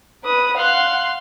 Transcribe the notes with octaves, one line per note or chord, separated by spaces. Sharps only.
B4 D#6
F5 F#5 C6 F#6